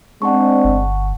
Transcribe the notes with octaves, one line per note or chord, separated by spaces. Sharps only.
G#3 C4 D4 F#5 A5 C#6
G1